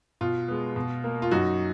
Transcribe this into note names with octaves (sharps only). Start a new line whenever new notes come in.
B2 F4
G#3 B3
B2
A#3
F4
F#2 D#4 F#4